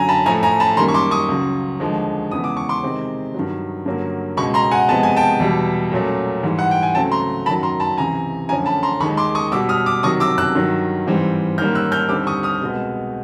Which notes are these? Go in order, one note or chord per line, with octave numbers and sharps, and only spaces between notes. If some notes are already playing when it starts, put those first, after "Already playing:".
Already playing: F#2 D3 F#3 G#5 A#5
A5 B5
A2 F3 A3 G#5 A#5
G#5 A#5
A5 B5
F#2 D#3 G3 A#3 A#5 C6
C#6
C6 D6
C#6 D#6
C#2 C#3 F#3
D#2 D3 F3 G#3
E2 C#3 E3 G#3 B3 D#6
D6
C#6
C6 D6
C3 D#3 G#3 C4
G2 D#3 F#3
G2 D3 F#3 A#3 C#4
C#2 B2 G#3 B5 C#6
A#5 C6
F#5 G#5
C3 F3 G#3 B3 A5
G#5
G5 A5
E2 B2 G3
A#2 F#3 A3 C#4
G#2 E3 G3
F#5
G5
G#5
C#2 C#3 F#3 A3 C4 G5 A5
A#5 C6
F#2 D#3 F#3 A5 B5
A#5 C6
A5 B5
C#2 C3 E3 G#5 A#5
F#2 D3 F3 A3 C#4 G#5 A#5
A5 B5
A#5 C6
D#2 D#3 G#3 B5 C#6
C6 D6
C#6 D#6
B2 G3 B3 D6 E6
D#6 F6
D6 E6
C3 D#3 F#3 C#6 D#6
D6 E6
E6 F#6
G2 D#3 F#3
G#2 E3 G3 C4
G#2 D#3 G3 A#3 C#4 F6 G6
E6 F#6
F6 G6
D#2 D3 G3 C4 D6 E6
C#6 D#6
D#6 F6
C2 B2 G#3 B3